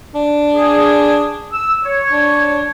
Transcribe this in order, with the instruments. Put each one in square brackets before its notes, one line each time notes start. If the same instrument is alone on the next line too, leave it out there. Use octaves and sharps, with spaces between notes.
[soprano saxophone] D4
[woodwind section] G#4
E6
C#5
[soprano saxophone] D4